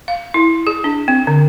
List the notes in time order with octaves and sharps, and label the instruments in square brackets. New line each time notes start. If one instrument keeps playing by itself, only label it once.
[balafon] F5
E4
G#4
D4
C4
D3